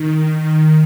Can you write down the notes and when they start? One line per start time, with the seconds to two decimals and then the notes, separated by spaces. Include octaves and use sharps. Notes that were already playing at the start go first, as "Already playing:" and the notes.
Already playing: D#3
0.37 D#3